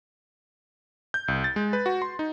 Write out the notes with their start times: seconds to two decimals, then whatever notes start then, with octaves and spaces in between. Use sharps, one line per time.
1.14 G6
1.28 C2
1.44 A6
1.56 G#3
1.73 B4
1.86 F#4
2.02 C6
2.19 D#4